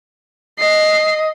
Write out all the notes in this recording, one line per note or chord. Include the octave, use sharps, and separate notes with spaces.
D#5 C7